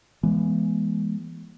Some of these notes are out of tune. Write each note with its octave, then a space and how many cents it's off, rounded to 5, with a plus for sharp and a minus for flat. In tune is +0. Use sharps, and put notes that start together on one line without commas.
E3 +25 G#3 +0 B3 -30